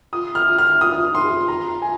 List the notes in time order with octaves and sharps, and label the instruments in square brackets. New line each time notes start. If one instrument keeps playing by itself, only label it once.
[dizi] F4 [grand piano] D#6
[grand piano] F6
[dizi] F4
[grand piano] F6
D#6
[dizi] D#4
F4
[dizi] D#4 [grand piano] C6
[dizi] G#4
F4
[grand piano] A#5
G#5